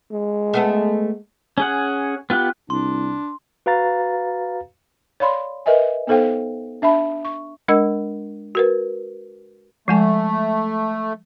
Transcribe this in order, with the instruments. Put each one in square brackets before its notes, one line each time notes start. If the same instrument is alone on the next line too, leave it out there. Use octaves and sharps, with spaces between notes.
[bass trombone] G#3
[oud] A3 B3 A4
[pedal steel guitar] C#4 G#4 F#5
B3 F4 G4 F#6
[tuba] C2 [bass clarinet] D4 [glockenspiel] C6
[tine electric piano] F#4 B4 F5 A#5 A6
[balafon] C#5 D5 F5 B5 C6
A#4 B4 D#5 E5 G#5
B3 D#4 A4 C5 F5 G5
D4 E5 A5 B5
C#6
[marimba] G#3 D4 A#4 D#5 E6
F#4 A#4 B4
[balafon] F3 G#3 G#5 [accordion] A3